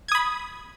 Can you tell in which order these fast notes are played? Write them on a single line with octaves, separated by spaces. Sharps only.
G#6 D#6 B5